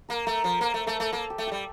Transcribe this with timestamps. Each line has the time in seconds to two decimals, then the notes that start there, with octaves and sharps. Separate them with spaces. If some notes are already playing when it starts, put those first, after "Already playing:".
0.09 A#3 A#4
0.26 A3 A#4
0.44 F3 C5
0.61 A#3 C5
0.74 A3
0.87 A3 A4
1.00 A3
1.12 A#3 A4
1.30 G4
1.38 A3
1.47 G3 G4